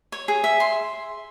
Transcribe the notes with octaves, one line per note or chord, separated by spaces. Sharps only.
C#5
G#4
E5
C6